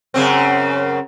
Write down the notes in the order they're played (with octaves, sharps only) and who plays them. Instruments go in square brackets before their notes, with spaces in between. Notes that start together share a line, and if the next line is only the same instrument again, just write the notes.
[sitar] F#2 C#3 C4